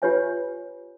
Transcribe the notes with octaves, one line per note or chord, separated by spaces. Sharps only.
F4 G4 B4 C#5 E5 G#5